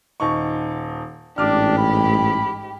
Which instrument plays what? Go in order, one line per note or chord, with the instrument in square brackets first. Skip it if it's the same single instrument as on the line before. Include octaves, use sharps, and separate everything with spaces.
[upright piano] D#1 D#4 C#6
[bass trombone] A1 [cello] G#2 G4 [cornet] D4 [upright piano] D6 F6
[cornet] B5